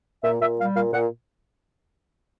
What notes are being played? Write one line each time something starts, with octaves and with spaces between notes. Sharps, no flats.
A#2 E5
A#2 E5
G3 F5
A#2 F5
A#2 F#5